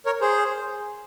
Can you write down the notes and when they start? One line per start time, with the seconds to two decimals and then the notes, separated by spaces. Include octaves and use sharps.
0.06 A#4 C#5
0.21 G#4 C5